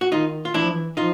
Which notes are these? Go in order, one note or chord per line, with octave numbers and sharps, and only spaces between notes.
F#4
D#3 D#4 F4
F4
E3 D4 E4
F3
E3
F3 D#4 F4